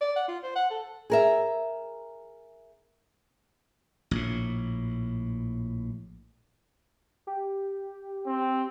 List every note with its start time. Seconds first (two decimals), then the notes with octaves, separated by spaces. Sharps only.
0.01 D5
0.16 F#5
0.28 F4
0.43 C5
0.56 F#5
0.70 A4
1.10 G#4 A#4 E5
4.11 A#1 A2
7.27 G4
8.26 C4